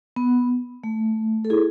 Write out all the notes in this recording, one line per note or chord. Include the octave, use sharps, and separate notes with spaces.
B3
A3
A4
E4 G#4